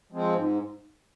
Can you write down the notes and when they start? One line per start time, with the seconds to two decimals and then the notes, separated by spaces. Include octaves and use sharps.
0.12 F3 G#3 C4
0.35 G#2